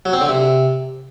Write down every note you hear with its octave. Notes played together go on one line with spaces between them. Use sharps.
F#3
C4
D3
C3